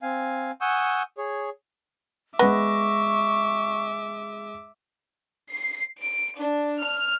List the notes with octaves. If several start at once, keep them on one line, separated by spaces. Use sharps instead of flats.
C4 F5 G#5
F#5 G#5 C#6 D#6 E6 G6
G#4 C#5
G#3 B3 E5 C#6 D6 A#6
C7
D7
D4
F6